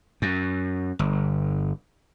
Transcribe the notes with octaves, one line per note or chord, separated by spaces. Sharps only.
F#2
G1